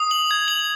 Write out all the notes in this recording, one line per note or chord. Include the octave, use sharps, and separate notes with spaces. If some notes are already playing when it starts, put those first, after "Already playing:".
Already playing: D#6
F#7
G#6
F#7